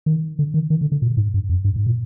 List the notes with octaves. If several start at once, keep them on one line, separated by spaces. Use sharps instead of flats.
D#3
D3
D#3
D#3
D3
D3
A#2
G#2
G2
F2
G2
G#2
A#2